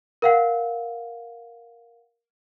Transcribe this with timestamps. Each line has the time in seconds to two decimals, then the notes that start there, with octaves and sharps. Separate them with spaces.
0.22 A#4 F5 F#5